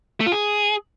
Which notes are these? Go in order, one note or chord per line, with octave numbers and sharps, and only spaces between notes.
A3
F4
G#4